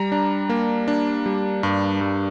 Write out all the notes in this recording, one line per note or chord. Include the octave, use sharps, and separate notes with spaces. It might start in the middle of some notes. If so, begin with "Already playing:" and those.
Already playing: G3 A#5
D4
A#3
D4
G3
G2
G2